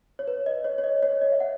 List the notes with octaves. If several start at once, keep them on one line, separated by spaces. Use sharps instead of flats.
C#5
B4
D#5
C#5
C#5
D#5
C#5
D#5
E5
F#5